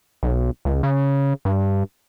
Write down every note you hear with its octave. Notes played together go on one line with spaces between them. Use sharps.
B1
C#2
C#3
G2